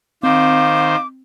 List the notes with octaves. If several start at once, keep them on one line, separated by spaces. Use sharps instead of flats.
D#3 C4 C5 F5 D6